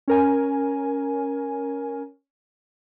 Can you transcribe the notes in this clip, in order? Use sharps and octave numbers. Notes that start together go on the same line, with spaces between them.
C#4 A#4 G#5